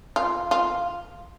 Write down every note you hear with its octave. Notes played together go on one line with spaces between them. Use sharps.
F4
F4